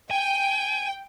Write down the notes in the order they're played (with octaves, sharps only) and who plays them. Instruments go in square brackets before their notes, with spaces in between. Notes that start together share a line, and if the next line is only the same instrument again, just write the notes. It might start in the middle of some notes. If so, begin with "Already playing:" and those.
[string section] G5 [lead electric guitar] G#5